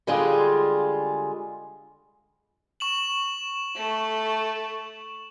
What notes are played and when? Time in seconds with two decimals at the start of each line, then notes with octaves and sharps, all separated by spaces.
0.07 D3 G3 G#3 F4 G#4
2.80 C#6 E7 F#7
3.76 A3